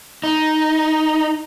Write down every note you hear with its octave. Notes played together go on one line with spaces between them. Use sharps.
D#4